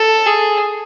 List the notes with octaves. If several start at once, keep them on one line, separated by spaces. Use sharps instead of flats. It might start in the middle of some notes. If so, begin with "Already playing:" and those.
Already playing: A4
G#4